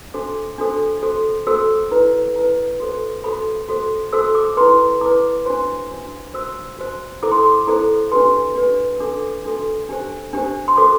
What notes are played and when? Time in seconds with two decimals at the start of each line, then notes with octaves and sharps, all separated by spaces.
0.14 D4 F#4 A4 C5 D6
0.58 D4 F#4 A4 C5
1.03 F#4 A4 C5
1.47 F#4 A4 C5 E6
1.91 E4 B4
2.36 E4 B4
2.80 F#4 A4 C5
3.24 F#4 A4 C5 B5
3.69 F#4 A4 C5
4.13 F#4 A4 C5 E6
4.35 D6
4.57 E4 B4 C6
5.01 E4 B4 D6
5.46 D4 F#4 C5 C6
5.90 D4 F#4 C5
6.34 F#4 C5 E6
6.79 F#4 C5
7.23 E4 A4 C5 D6
7.32 C6
7.40 D6
7.67 E4 A4 C5
8.12 D4 G4 B4 C6
8.56 D4 G4 B4
9.00 D4 F#4 A4 D6
9.44 D4 F#4 A4
9.89 D4 G4 C5
10.33 D4 G4 C5
10.68 C6
10.77 F#4 A4 C5 D6